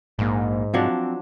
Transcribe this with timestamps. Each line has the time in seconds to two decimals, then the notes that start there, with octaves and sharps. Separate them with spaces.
0.19 A#1 G#2 A#3
0.74 F3 F#3 C4 D4